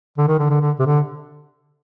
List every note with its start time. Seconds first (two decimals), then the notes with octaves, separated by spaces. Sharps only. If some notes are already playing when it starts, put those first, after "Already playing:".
0.18 D3
0.28 D#3
0.39 D3
0.50 D3
0.61 D3
0.79 C3
0.86 D3